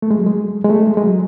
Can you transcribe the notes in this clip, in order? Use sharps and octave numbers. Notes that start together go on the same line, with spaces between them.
A3
G#3
F#3
G#3
G#3
A3
G#3
G#3
F#3